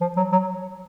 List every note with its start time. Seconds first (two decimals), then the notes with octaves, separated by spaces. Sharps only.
0.01 F3
0.17 F#3
0.32 F#3